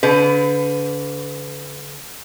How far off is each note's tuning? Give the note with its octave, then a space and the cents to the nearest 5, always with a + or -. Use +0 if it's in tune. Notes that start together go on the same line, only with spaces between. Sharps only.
D3 -35 B4 +20